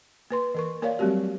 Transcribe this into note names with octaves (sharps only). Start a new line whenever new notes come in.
A#3 B4 C6
E3 A#4 C#6
A#3 A#4 C#5 D5 F5
F#3 G3 A3 C4 F#4 G4